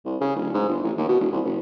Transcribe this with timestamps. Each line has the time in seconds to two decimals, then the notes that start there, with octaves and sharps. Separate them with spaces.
0.05 C2
0.21 C#3
0.35 D1
0.54 G#2
0.69 G1
0.83 A1
0.97 D#2
1.09 B2
1.20 E1
1.32 C2
1.45 F#1